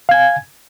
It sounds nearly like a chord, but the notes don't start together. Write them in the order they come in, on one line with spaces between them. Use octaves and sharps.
F5 G#6 G#5